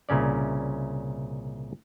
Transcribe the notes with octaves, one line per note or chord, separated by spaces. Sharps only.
C2 A#2 C#3 C#4 D5